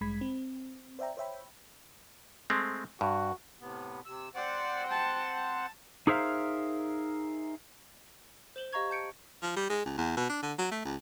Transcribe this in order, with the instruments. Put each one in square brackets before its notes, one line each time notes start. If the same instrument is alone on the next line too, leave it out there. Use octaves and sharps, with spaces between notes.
[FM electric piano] A1 G2 G#3 B5 G#6 B6
C4
C5 D5 E5 G5 A#5
C5 C#5 E5 G5 B5
[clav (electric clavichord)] G#3 A3 C4
[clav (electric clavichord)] G2 [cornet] F#4
[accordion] A2 C3 B3
C3 E6
[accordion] C4 C5 F#5 [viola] D5
[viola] G5 A5
A5
[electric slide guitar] D#4 G#4 A#4 C5 E5 F5
[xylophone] C5 E7 F#7 G7
G4 D#5 F5 A#5 C#6 G#6
A5 G6 C#7 D7
[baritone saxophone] F3
G3
G#3
C#2
E2
B2
D4
D3
F#3
A3
C#2